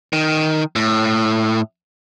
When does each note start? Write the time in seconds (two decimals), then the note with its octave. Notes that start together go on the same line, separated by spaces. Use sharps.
0.13 D#3
0.76 A2